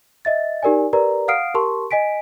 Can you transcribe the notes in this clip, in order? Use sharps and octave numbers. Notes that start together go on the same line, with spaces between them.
D#5 E5 A6
D#4 G4 A#4 D5 G#5
G4 A#4 B4 D5 A#5
F5 F#5 D#6 F6 C7 D7
G4 A#4 A5 C6 C#6
D#5 G#5 B6 D7